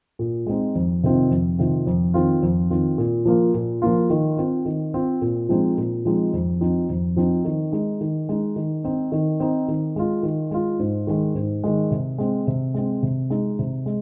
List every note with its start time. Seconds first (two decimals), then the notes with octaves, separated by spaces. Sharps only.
0.19 A#2
0.46 G#3 C4 D#4
0.75 F2
1.03 C3 D#3 C4 F4
1.31 F2
1.59 C3 D#3 C4 F4
1.87 F2
2.14 D#3 C4 F4
2.43 F2
2.70 D#3 C4 F4
2.98 A#2
3.25 F3 A#3 F4
3.54 A#2
3.82 F3 A#3 F4
4.10 D#3
4.37 C4 F4
4.65 D#3
4.94 C4 F4
5.22 A#2
5.49 F3 G#3 C4 D#4
5.77 A#2
6.05 F3 G#3 C4 D#4
6.33 F2
6.61 F3 C4 D#4
6.89 F2
7.16 F3 C4 D#4
7.45 D#3
7.72 G#3 D#4
8.01 D#3
8.29 G#3 D#4
8.56 D#3
8.84 C4 D#4
9.12 D#3
9.40 C4 D#4
9.68 D#3
9.96 G#3 F4
10.23 D#3
10.51 G#3 F4
10.80 G#2
11.07 D#3 G#3
11.35 G#2
11.64 D#3 G#3
11.91 C3
12.18 G#3 C4
12.47 C3
12.74 G#3 C4
13.03 C3
13.30 G#3 D#4
13.59 C3
13.86 G#3